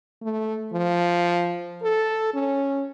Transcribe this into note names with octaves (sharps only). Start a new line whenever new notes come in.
A3
F3
A4
C#4